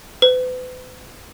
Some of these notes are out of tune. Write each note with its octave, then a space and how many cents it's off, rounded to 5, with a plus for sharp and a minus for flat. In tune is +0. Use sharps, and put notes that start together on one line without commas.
B4 +40